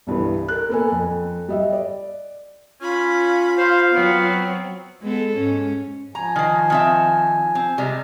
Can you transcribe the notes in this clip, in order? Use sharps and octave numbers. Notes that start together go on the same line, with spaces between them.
C2 G2 E3 B3
A#4 F#6
A#3 B3 A4 B4 G#5
F2
G3 D#5 E5
D5
C#4 F4 B5
C5 F5
F#3 B3 C4
G#3 B3 A4
G#2 C#4
F3 G#5 A#5
D#3 C5
D#3 C4 E5
C4
C3 G3 G#3